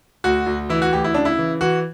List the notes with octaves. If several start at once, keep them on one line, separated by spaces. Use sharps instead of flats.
D2 F#4
D2
E3 E4
F#4
D2 G4
E4
C#3 D4
E4
E3
E3 F#4